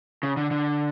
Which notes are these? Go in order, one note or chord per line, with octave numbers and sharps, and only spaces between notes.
C#3
D3
D3